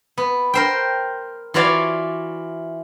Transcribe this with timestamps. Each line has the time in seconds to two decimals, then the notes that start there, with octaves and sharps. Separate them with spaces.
0.18 B3
0.54 A#4 C5 G5
1.54 E3 F4 F#4 C#5 D5 F5